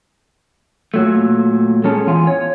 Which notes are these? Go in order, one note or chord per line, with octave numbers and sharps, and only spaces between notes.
A#2 F#3 A3
G#3 C#4 A4
E2 F4 G#5
C#5